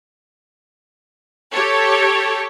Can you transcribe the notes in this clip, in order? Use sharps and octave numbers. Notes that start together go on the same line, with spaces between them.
G4 A4 C#5